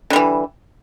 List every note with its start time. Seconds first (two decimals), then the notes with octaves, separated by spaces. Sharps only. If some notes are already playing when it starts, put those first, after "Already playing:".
0.10 D3
0.13 G3
0.16 E3